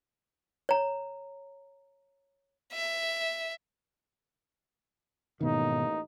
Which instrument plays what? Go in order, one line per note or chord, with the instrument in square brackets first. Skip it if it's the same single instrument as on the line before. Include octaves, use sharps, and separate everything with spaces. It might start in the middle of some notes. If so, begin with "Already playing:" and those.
[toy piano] C#5 A#5
[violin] E5
[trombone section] A1 A#3 D#4 [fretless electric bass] G#2 B2 D#3